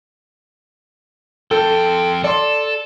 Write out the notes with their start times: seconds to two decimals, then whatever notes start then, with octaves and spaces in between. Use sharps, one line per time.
1.51 F2 A4 G5
2.24 A4 D5 C6